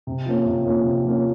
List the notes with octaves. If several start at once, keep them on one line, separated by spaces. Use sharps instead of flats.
C3
F3 A#3 C#4
C3
F3 A#3 C#4
C3
F3 A#3 C#4